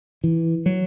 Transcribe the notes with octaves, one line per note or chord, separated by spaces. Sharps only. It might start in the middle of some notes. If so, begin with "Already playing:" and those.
E3
F#3